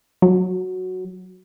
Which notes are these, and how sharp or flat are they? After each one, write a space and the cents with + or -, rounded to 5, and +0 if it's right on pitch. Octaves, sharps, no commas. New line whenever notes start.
F#3 -5